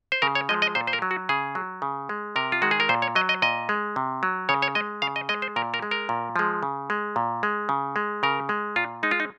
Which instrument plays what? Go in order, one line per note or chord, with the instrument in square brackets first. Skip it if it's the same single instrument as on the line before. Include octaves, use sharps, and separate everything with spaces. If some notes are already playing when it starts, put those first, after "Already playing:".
[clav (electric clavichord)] C5
C#3 A#4
C#5
F3 G#3 D#5
D#5
A#2 C5
C5
A#4
F#3
F#4
C#3 G#4
F#3
C#3
G#3
C3 A#4
F4
D#3 G#3 F#4
G#4
A#4
A#2 C5
C#5
F#3 D#5
D#5
A#2 D#5
G#3
C3
F#3
C#3 C#5
C#5
G#3 D#5
C#3 F5
D#5
G#3 D#5
C5
A#2 A#4
A#4
G#3
A#4
A#2
F3 G#3
C#3
G#3
A#2
G#3
C#3
G#3
C#3 A#4
G#3
A#2 F4
G#3 D#4
F4
D#4